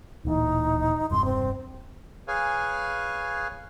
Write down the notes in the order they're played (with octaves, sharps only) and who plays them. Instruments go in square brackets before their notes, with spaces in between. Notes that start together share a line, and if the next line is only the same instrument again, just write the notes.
[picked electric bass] D1 A#2 E3 [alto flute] D#4
[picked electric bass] E1 G2 C3 [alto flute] C6
[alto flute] C4
[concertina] G#4 B4 C#5 F5 G#5